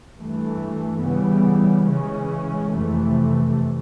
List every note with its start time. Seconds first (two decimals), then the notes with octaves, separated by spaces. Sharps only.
0.16 G2 E3 A3
1.01 C#3 E3 G3 B3
1.86 C#3 E3 G#3 C#4
2.71 F2 C3 E3 A3